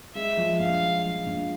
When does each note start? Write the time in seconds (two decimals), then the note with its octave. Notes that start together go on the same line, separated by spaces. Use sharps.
0.15 G#3 E5
0.37 F3
0.59 A#1 F5
0.81 G#3
1.04 F3 F5
1.26 A#1